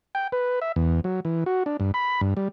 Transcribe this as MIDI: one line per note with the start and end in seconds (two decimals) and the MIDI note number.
0.15 0.28 79
0.32 0.60 71
0.62 0.72 76
0.76 1.00 40
1.04 1.20 54
1.25 1.44 52
1.46 1.63 66
1.66 1.77 62
1.80 1.92 43
1.94 2.21 83
2.21 2.34 43
2.37 2.48 55